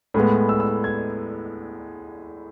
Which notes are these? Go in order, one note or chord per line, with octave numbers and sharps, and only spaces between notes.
A2 G#3 B3
E6
E6
G#6